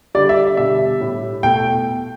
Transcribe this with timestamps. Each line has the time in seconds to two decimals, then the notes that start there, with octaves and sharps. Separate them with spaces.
0.15 D3 G3 D5
0.29 E5
0.57 B2 G3 E5
1.01 A2 G3
1.43 B2 A3 G5